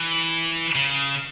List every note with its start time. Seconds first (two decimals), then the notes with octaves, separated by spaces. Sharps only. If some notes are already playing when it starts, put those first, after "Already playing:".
Already playing: E3
0.75 C#3